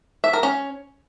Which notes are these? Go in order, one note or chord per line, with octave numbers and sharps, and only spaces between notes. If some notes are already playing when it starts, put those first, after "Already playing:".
E5
A#4
C#4